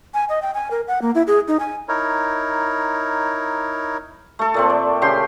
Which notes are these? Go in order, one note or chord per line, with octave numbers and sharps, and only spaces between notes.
G#5
D#5
G5
G#5
A#4
F#5
A#3
E4
G#4
D#4
G#5
D#4 E4 A#4 C#5
A3 A4
A#2 A3 C4
D5
C#3 G4 G5 C6